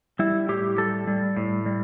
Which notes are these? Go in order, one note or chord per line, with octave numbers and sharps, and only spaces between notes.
G3 E4
A2 G4
G3 A4
G3
A2
G3